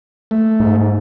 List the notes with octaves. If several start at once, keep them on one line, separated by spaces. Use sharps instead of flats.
A3
G#2